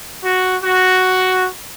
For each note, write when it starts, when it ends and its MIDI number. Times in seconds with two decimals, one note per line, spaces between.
0.23 0.55 66
0.63 1.48 66